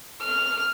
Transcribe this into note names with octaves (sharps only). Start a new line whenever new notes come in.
F6